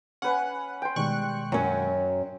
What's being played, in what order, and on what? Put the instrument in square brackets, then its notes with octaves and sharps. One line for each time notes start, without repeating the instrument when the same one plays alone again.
[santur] C#4 B4 G#5 [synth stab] F#5
[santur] G5 C6
[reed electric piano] B2 D#3 G#3 [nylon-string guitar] G3 [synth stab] C#6 F#6
[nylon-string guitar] F#2 C#4 [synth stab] F#3